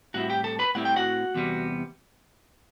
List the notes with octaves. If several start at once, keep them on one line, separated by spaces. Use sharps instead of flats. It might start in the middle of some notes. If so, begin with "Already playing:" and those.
A2 G3 C4 E4 F#4 F#5
G4 G5
A4 A5
B4 B5
A2 G3 C4 E4 F#5
G5
F#4 F#5
E2 C3 G3 B3